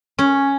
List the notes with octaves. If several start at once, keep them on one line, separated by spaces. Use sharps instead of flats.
C#4